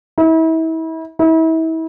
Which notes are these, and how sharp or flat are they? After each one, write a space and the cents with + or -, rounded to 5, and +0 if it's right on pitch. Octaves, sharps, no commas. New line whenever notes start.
E4 -35
E4 -35